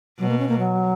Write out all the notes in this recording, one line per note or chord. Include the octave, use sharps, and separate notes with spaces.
B2 F#3
A#3
C#4
A#3
F#3